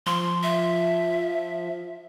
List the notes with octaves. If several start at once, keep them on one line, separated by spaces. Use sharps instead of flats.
F3 C6
E5